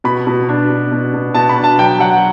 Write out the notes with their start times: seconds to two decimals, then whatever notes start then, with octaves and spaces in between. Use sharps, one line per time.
0.04 B2 B5
0.27 B2
0.49 D4
0.70 B2
0.92 B2
1.13 B2
1.34 B2 A5
1.49 B5
1.57 D4
1.64 A5
1.78 F#3 G5
2.00 F#3 F#5